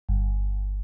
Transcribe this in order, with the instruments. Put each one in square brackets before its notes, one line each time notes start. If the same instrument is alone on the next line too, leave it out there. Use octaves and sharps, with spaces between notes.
[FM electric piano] G1